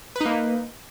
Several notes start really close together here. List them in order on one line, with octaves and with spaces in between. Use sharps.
B4 D#4 A#3